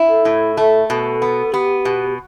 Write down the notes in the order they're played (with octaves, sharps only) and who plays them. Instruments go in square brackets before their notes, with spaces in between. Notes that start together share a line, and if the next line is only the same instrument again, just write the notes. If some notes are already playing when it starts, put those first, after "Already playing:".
Already playing: [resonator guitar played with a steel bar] E4
[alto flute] A4
[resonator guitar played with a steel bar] A2
A3
[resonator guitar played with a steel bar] B2 [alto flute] A4
[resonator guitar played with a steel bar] B3
[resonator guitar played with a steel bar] B3 [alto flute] G4
[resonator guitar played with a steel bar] B2